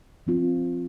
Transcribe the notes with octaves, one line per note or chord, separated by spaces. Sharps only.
F3 C4 F4